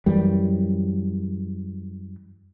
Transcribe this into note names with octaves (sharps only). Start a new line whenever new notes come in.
F#2 E3 G3